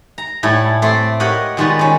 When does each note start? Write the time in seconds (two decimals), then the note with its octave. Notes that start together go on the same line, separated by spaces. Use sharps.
0.18 A#5
0.43 A2 G3 E4 A4 G#5
0.82 A3 C4 D5 C6
1.20 G4 A#4 C#5 D#5 F#5
1.57 A#2 D#3 G3 G#3 B3 F#4
1.79 D#3 C#4